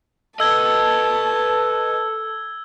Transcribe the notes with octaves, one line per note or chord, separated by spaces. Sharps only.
A4 B4 D#5 A5 E6 G#6 G7